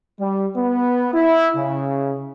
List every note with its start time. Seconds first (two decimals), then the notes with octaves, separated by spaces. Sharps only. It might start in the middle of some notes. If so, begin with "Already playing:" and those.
0.20 G3
0.57 B3
1.14 E4
1.56 C#3